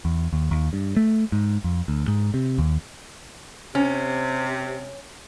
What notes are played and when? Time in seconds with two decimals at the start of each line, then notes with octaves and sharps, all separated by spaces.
0.05 E2
0.33 D#2
0.51 D#2
0.73 G2
0.96 A3
1.32 G#2
1.64 F2
1.88 D2
2.08 G#2
2.34 C3
2.58 D#2
3.75 C3 C#4